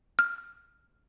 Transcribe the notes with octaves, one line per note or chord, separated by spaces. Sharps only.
F6